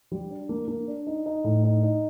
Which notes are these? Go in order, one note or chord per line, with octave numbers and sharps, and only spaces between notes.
G3
D4
A#3
A#3
D4
D#4
D#4
A2
D#4
D#4